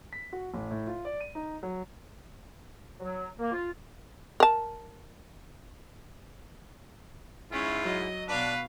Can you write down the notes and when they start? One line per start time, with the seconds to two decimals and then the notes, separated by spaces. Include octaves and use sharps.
0.13 B6
0.33 F#4
0.54 A1
0.71 A2
0.87 F4
1.05 D5
1.20 D#7
1.35 D#4
1.63 F#3
3.00 F#3
3.39 A#3
3.52 F4
4.40 A#4 A5
7.52 G#2 C#4 E4 F4
7.85 F#3 D#5
8.29 B2 D4 B4 F5